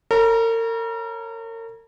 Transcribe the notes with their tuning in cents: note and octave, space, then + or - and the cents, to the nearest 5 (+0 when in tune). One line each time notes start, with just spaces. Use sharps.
A#4 -40 C#5 -15 A#5 +35